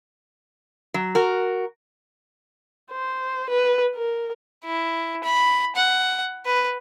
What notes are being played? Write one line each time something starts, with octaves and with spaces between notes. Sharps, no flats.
F#3
F#4 A#4
C5
B4
A#4
E4
B5
F#5
B4